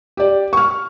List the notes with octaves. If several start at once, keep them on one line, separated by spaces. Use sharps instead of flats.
G4 D5
C#6 F6